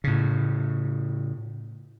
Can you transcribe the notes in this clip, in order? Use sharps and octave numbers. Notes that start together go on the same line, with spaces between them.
A2 C#3